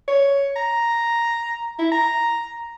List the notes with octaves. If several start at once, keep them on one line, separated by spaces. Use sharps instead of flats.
C#5
A#5
E4
A#5